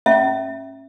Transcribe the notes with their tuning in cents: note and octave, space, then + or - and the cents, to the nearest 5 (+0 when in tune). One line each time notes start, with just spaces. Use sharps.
C#4 -30 E5 +0